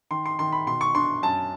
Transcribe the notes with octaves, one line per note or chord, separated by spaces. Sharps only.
D#3 C6
C6
D#3 C6
B5
B2 C6
C#6
D4 C6
F#2 A5